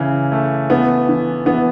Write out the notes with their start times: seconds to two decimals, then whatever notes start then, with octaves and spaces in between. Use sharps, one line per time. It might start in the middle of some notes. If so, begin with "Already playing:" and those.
Already playing: C#3 E3
0.32 A3
0.70 E3 B3
1.09 E3
1.46 E3 B3